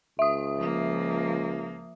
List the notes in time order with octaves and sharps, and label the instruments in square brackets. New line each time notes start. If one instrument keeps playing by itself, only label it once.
[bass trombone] C#2 [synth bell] E5 D#6
[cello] F3 A#3